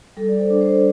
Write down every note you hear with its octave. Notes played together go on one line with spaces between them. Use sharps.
G3 A4
D5
C5
D4
C5